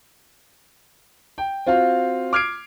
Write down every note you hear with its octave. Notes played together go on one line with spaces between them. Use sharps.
G5
C4 F4 F#4 F5
D6 F6 G#6 C7 D7